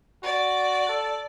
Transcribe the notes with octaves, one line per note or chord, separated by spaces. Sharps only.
F#4 D5
A4